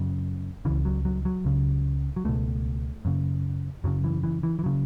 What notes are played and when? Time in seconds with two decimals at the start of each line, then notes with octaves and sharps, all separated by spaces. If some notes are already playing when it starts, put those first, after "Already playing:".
Already playing: F#2 C#3
0.65 C#2 C#3 E3
0.85 F#3
1.05 F#3
1.25 F#3
1.45 C#2 C#3
2.16 F#3
2.25 C#2 B2 A3
3.05 F#2 C#3
3.84 F#2 C#3 F#3
4.04 E3
4.24 E3
4.43 E3
4.59 E3
4.64 C#3 F#3